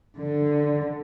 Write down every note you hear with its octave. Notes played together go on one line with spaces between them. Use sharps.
D3